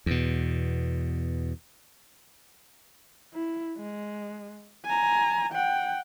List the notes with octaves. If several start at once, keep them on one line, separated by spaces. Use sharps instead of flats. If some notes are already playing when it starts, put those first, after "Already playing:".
E2 B2
E4
G#3
G#5 A#5
F#5 G5